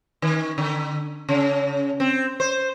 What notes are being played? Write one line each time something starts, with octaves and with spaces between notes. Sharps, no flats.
D#3
D3
C#3
C4
C5